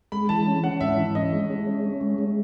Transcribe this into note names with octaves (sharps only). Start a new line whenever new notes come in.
G#3 B5
E3 A5
C#4
C#4 F#5
G#2 E5
E3
C#4 D#5
G#3
G#3
C#4
C#4
G#3
G#3